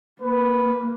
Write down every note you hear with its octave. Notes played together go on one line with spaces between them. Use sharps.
A#3 B4